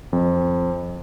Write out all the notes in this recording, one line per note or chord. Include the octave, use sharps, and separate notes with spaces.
F2